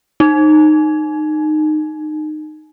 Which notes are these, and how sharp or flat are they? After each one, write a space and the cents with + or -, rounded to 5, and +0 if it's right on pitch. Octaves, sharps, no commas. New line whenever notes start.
D#4 -20